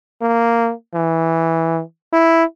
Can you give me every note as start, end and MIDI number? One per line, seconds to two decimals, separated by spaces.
0.22 0.72 58
0.95 1.81 52
2.13 2.44 64